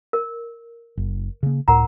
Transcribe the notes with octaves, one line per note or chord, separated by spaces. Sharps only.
A#4
F#1
C#3 A#3
C#2 A2 A#4 F#5 A#5